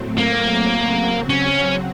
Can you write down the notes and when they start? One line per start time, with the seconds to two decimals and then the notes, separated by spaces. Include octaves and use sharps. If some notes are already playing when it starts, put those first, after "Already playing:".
Already playing: A2 F#3 A3 C4
0.18 A#3
0.80 C#3 F#3 C4 F#4
1.29 C#4